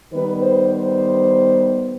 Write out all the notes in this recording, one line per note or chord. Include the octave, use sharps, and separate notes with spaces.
D#3 G3 B3 B4
C5
C5